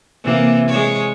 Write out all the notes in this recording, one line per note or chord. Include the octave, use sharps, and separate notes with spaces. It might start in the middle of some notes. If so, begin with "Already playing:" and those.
C3 E3 A#3
G#3 C#5